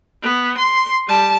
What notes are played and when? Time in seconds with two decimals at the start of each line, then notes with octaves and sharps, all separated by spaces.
0.22 B3
0.58 C6
1.08 G3 A5